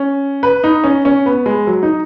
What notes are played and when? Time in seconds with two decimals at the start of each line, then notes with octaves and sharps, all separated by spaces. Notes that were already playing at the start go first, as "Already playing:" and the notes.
Already playing: C#4
0.43 B4
0.64 D#4
0.84 C#4
1.05 C#4
1.26 B3
1.46 G#3
1.67 F#3
1.83 D#4